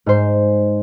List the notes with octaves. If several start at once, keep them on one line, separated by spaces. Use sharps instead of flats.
G#2 C5